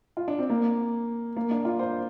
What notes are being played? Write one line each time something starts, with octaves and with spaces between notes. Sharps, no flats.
F4
D4
C4
A#3
A#3
D4
F4
C5